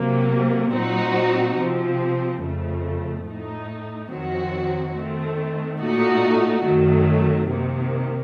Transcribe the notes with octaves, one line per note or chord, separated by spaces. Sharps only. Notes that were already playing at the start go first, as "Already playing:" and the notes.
Already playing: C3 F#3 A#3
A#2 F#3 C4 D#4 F#4
C3 F3 C4
F2 C#3 A3
A2 A3 D#4
F2 D#3 F#3 C4 F#4
D#3 A3 C4
A#2 A3 D#4 F#4
F#2 D#3 F#3 A3
C3 D#3 A#3